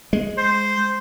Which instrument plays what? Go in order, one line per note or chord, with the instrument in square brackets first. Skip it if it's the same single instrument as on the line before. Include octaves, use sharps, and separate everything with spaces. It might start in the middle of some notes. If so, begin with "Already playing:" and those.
[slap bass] G#3
[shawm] C5